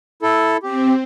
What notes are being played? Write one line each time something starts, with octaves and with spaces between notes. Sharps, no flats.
E4 A4
C4 G4